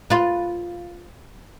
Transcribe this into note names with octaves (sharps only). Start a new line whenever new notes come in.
F4 B4